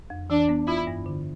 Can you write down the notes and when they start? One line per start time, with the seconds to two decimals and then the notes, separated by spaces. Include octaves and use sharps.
0.10 F2
0.30 E3 D4
0.49 B3
0.67 E4 F4
0.87 G2
1.06 D3